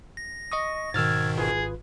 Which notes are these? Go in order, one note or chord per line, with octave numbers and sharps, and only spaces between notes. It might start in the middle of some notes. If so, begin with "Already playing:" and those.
A#6
D#5 C#6 D#6
G#2 B2 D#3 E6 F6 G#6 A6
G#1 F4 G#4 B4